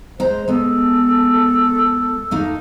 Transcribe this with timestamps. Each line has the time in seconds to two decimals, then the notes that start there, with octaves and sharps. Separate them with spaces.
0.20 G#3 C5 A#5
0.48 G#3 B3 A4
2.31 A3 A#3 D#4